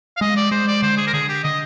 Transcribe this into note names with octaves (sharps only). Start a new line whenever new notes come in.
F5
G#3 D#5
D5
G#3 C5
D5
D3 C5
G#4
A#4
D3 G#4
G4
D3 D#5